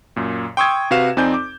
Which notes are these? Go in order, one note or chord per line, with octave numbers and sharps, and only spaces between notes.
F#2 A#2
G5 C6 C#6 D#6 E6 G#6
C3 F#4 B4 F5 E7
F2 C4 D#4 D5 G#5 G6
D6